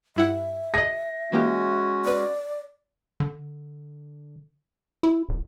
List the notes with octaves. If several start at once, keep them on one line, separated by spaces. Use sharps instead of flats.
G2 E4 E5 F#5
G#4 D#5 A#6
E3 G#3 A#3 C#4 F#4 G4
B3 B4 D5
D3
E4
D#1